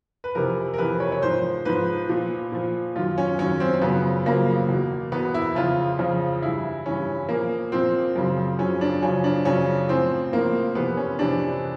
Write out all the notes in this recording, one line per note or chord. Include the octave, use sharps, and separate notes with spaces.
B4
F2 C3 E3 A#4
A#4
F2 C3 E3 B4
C#5
C#5
G#2 F3 C5
G#2 F3 B4
A#2 F3
A#2 F3
F#2 D#3 F4
C#4
F#2 D#3 C#4
C4
C4
F#2 C#3 F3 B3
F#2 C#3 F3 A#3
E2 B2
E2 B2 B3
E4
F2 C#3 F3 F4
F2 C#3 F3
G2 E3 E4
G2 E3 C#4
A#2 F3 A#3
A#2 F3 C4
F#2 C#3 F3
F#2 C#3 F3 C#4
D4
F#2 C#3 F3 C#4
D4
F#2 C#3 F3 C#4
A2 F3 C4
A2 F3 A#3
F2 C3 E3 B3
C#4
F2 C3 E3 D4